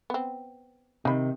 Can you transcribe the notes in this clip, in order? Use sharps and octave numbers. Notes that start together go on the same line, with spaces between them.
B3 C4
C3 D#3 D#4 B5